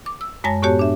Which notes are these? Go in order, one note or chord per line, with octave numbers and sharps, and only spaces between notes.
D6
E6
F#2 G#3 C#5 G#5 A5 A#6
A2 B3 F#4 G4 C#5 A5
D4 E5